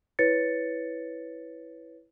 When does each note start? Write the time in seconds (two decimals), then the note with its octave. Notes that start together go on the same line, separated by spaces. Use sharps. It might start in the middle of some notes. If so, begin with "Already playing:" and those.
0.19 E4 B4 C#5 A6 C#7